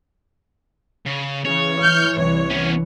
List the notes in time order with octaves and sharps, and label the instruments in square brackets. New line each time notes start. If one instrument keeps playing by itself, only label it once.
[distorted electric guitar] C#3
[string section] C#3 [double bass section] E3 [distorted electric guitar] C#5
[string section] F6 G6
C2 C#5
[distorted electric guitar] B3 C#4